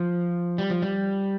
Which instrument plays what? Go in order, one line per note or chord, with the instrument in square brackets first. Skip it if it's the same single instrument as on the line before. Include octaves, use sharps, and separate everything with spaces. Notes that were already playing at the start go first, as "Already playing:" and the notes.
Already playing: [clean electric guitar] F3
G3
F3
G3